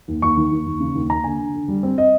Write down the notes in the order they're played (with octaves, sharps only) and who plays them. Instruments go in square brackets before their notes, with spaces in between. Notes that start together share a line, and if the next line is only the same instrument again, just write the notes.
[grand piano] D#2
D#2 C#6
D#3
D#2
D#2
C#3
D#2
A#3 A#5
D3 G#5
D3
D3
G3
C4
D#5